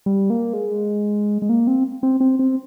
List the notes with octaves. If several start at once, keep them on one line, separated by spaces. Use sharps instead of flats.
G3
A#3
G#3
G#3
A#3
C4
C4
C4
C4